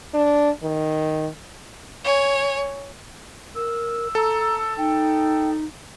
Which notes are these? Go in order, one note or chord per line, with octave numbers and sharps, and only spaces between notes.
D4
D#3
C#5 G#5
A#4 E6
A4 A#5
D#4 G5